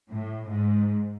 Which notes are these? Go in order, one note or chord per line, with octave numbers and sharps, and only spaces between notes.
A2
G#2